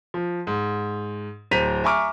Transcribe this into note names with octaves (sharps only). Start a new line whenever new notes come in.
F3
G#2
D1 C5 A#5 B6 D#7 F7
E5 G#5 A#5 C#6 D6 F6